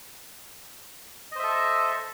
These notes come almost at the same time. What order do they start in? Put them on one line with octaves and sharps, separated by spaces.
D#5 C5 E5 A4